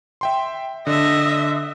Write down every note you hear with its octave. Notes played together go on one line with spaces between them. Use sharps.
E5 G5 C6
D3 D4 D#5 E5